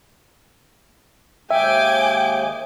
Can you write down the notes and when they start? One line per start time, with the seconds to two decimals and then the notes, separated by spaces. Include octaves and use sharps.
1.51 D#2 G#3 G#4 E5 G5 G#5 D6 G6